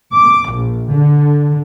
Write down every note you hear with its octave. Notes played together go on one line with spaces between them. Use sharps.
D6
A#1
D3